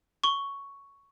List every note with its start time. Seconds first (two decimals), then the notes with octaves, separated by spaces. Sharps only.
0.24 C#6 G7